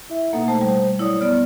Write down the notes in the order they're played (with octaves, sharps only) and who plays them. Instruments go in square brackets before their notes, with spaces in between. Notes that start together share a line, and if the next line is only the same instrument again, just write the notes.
[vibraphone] E4 E5
[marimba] B2 A#3 [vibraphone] D#4 A4 F#5
[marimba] A3 [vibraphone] C5
[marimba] G3
[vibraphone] F#3 C#5 D5 [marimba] E4 D#6
[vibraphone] B3 [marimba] D5 F6